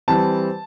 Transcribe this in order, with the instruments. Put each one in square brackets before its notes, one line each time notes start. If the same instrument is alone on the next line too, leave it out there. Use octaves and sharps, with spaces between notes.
[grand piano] E3 G3 C4 A5